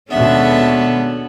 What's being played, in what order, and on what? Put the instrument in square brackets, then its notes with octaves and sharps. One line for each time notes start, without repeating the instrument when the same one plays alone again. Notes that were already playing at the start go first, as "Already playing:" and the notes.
[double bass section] D#2 B2 G#3 [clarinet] B3 [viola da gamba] C#4 D4 A4 [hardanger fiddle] E5